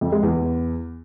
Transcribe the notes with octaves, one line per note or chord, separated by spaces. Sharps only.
F2
G#3
E2